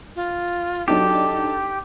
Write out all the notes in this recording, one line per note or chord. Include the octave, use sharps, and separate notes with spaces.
F4
F#3 D4 D#4 G4 A4